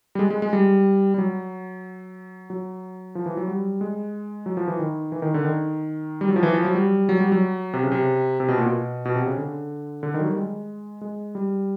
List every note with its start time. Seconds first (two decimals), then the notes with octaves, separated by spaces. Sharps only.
0.15 G3
0.19 G#3
0.30 G#3
0.42 G#3
0.53 G3
1.14 G3
1.18 F#3
2.50 F#3
3.15 F3
3.26 E3
3.37 F#3
3.48 G3
3.81 G#3
4.46 F#3
4.57 F3
4.68 E3
4.79 D#3
5.12 E3
5.22 D#3
5.34 D3
5.45 D#3
6.21 G3
6.29 F#3
6.36 F3
6.43 E3
6.54 F3
6.65 F#3
6.75 G3
7.09 F#3
7.20 G3
7.32 F#3
7.73 C3
7.83 C#3
7.92 C3
8.40 C3
8.48 B2
8.58 A#2
8.66 B2
9.05 B2
9.15 C3
9.27 C#3
9.37 D3
10.03 D3
10.14 D#3
10.20 F#3
10.25 G3
10.37 G#3
11.01 G#3
11.35 G3